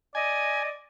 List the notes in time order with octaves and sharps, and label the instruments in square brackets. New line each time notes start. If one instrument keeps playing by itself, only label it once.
[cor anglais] D5 [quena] D#5 [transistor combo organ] G#5